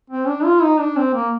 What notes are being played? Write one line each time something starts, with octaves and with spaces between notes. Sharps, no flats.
C4
D4
F4
D#4
D4
C4
A#3